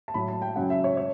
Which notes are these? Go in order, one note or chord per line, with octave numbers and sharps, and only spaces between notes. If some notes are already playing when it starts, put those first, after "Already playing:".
A5
A2 F#3 B5
A5
G5
F#2 C#3 F#3 F#5
E5
C#5
C#5